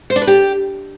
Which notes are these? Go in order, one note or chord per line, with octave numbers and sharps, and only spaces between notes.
C5
D4
B4
G4